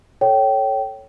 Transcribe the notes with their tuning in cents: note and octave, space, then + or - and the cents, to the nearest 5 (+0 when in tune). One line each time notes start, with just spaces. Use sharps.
A4 +0 C#5 +0 G5 -20